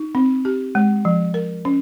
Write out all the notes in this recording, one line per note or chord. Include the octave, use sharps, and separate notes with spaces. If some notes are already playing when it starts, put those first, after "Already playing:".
Already playing: D#4
C4
G4
G#3
F3
A#4
C#4